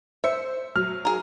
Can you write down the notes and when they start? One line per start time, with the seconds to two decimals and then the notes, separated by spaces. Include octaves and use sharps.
0.24 C5 E5 C#7
0.76 F#3 F6
1.05 G#4 A#4